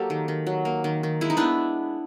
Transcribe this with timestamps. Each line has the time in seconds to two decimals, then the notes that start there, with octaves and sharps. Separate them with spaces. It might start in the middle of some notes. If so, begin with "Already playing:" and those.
Already playing: F#3 A#3 G4 A4
0.10 D#3
0.28 D#3
0.47 F#3
0.65 A#3
0.84 D#3
1.03 D#3
1.21 G#3 E4
1.30 D#4
1.37 B3 D4 E4